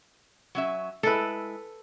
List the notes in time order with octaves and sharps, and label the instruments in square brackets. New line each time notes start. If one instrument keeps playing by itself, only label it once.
[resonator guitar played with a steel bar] F#3 C#4 E5
[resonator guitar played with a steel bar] G#3 E4 [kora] A4 B4